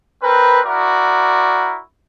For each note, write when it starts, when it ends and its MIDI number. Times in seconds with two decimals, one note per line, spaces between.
0.23 0.61 60
0.23 0.61 70
0.23 0.61 71
0.66 1.79 64
0.66 1.79 66
0.66 1.79 70
0.66 1.79 74